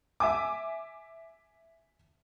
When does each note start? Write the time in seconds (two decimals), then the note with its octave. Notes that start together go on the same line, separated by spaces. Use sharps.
0.20 E5 G#5 D6